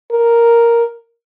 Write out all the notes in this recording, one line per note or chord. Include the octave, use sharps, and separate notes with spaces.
A#4